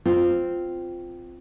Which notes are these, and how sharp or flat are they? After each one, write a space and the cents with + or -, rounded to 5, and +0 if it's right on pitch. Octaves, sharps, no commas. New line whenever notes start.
C4 -10 F4 +0